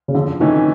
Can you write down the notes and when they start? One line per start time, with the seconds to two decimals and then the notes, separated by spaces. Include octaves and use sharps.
0.08 C#3
0.14 F2 D3
0.40 C3 D#3 E3 A3 C#4